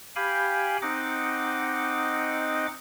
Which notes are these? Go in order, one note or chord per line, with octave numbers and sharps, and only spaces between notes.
G4 F5 G5 G#5 B5
C4 D#4 D#5 F#5 D6